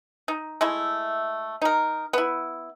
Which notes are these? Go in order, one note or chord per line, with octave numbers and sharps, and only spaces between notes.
D#4
G#3 A3 E4
D#4 A#4
B3 E4